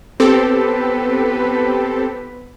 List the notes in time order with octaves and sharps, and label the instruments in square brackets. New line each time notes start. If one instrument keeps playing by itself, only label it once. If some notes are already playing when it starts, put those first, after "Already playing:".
[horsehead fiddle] B3 B4 [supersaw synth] C4 G4 A4